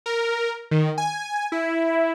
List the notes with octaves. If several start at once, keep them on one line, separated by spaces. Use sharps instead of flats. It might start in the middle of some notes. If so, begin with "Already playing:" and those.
A#4
D#3
G#5
E4